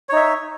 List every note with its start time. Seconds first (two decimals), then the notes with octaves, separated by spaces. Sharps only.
0.09 C#5
0.13 D#4
0.16 E5